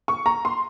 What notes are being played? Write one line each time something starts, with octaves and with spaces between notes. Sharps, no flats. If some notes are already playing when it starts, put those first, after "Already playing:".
C#6
A#5
C6